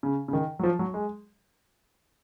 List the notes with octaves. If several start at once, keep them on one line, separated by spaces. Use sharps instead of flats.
C#3
C#3
D#3
F#3
F3
F#3
G#3